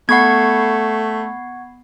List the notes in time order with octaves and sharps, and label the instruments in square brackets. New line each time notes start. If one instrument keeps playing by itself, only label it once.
[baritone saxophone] A3 [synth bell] B3 B5 C7 [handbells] F#5 C#6 G#6